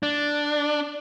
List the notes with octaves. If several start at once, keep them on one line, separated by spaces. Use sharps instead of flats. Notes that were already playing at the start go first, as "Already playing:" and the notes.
D4